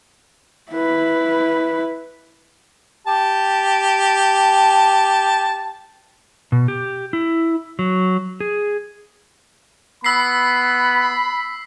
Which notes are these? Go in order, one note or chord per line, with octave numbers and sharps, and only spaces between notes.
E4 B4
G4 A5
B2
G4
E4
F#3
G#4
B3 B5 E6 B6 C7